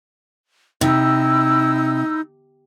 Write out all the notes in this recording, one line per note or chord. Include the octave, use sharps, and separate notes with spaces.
C3 D#4 E4 E6